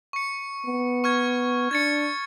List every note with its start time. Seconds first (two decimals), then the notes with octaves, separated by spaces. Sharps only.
0.13 C#6 C#7
0.66 B3
1.04 C#6 F6 G#6
1.71 D4 G#6 A6 C#7